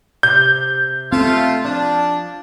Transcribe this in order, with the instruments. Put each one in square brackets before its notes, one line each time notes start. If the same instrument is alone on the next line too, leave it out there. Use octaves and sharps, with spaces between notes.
[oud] C3 [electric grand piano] G6
[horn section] A3 F4 [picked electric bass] C4
[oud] F3 [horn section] D4